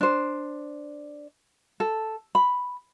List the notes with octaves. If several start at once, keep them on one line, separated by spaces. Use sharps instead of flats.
D4 C5
A4
B5